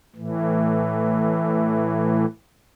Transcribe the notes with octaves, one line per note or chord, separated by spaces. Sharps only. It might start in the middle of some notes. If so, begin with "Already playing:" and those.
A2 E3